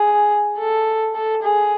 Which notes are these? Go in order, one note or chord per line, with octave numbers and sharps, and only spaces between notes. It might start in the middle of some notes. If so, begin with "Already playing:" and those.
Already playing: G#4
A4
A4
G#4